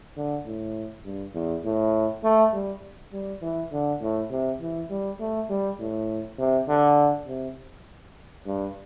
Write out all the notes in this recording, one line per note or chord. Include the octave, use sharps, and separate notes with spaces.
D3
A2
G2
E2
A2
A3
G3
G3
E3
D3
A2
C3
E3
G3
A3
G3
A2
C3
D3
C3
G2